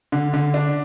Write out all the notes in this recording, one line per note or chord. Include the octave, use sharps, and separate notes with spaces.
D3
D3
D4